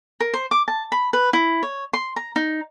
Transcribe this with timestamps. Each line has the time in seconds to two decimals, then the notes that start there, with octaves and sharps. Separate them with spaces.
0.20 A#4
0.34 C5
0.51 D6
0.68 A5
0.92 B5
1.13 B4
1.33 E4
1.63 C#5
1.93 C6
2.16 A#5
2.36 D#4